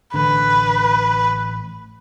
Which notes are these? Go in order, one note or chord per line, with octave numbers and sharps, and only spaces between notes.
A1 D3 B4